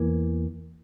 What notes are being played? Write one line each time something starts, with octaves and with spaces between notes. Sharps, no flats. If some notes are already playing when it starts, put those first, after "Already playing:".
Already playing: E2 E3 A#3